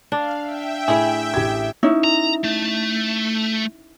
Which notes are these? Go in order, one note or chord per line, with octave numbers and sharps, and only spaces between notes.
D4 F5
E5 G5
A2 E4 G#4
A1 G4 G#6
C#4 D#4 E4
A#5
A3